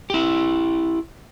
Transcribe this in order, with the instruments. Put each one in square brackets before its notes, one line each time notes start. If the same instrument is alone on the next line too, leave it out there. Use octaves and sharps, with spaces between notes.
[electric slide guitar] E4 G4